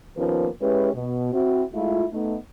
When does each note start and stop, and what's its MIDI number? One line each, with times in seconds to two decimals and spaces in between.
0.17 0.47 39
0.17 0.47 53
0.17 0.47 58
0.17 0.47 59
0.17 0.47 61
0.17 0.47 71
0.61 0.91 56
0.61 0.91 61
0.61 0.91 64
0.61 0.91 67
0.61 0.91 71
0.94 1.33 47
1.33 1.63 60
1.33 1.63 64
1.33 1.63 66
1.74 2.04 56
1.74 2.04 57
1.74 2.04 64
1.74 2.04 65
2.12 2.37 57
2.12 2.37 59
2.12 2.37 63